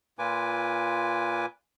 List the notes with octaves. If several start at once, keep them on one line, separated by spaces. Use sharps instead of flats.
A#2 F4 B4 G#5 D6